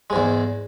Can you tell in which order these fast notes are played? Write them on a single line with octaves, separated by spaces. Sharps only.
G#3 G#2 E2